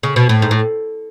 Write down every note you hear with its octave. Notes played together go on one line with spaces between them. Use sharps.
C#3
B2
A2
G#2
A2